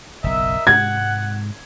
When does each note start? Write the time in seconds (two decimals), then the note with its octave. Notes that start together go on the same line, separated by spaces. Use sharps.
0.24 F#1 B1 A#4 D#5 E5
0.67 G#2 C3 G#3 F#5 G#6